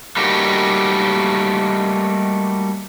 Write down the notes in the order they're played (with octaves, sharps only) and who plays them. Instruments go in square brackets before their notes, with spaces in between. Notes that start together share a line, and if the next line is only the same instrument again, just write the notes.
[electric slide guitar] G3 A3 A#3 D#4 F#4 G4